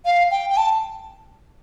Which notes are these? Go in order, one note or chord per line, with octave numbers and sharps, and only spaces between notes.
F5
G5
G5
A5